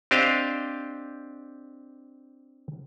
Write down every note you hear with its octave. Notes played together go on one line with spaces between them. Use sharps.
C4 D4 G4 C5 D#5 F5